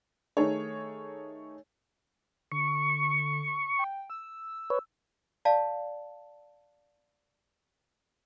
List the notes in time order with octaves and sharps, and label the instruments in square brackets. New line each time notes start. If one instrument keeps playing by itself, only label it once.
[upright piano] D#3 A3 D#4 G#4 A4 C#5
[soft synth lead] D3 [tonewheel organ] C#6
[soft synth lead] G5
E6
[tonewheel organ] B4 C#5
[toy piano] D5 F5 A5